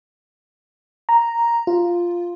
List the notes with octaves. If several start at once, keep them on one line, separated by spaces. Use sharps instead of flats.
A#5
F4